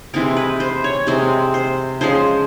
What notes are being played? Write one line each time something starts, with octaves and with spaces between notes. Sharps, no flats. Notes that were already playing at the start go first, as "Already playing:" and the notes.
C3 E3 G#3 C4 A#4
B4
C5
C#5
C3 E3 G#3 C4 C5
C5
C#3 F3 G#3 C5